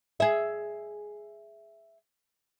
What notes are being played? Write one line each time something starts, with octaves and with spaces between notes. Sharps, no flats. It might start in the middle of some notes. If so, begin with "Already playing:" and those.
G#4 E5